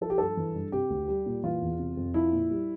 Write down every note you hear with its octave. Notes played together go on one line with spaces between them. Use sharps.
F3 A4
G4
G2 A4
E3
G2
C3 G4
D2
G3
A#2
E3 F4
E2
C3
F2
F3 E4
A#2
G3